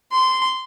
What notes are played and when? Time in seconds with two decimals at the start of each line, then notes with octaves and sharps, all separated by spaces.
0.12 C6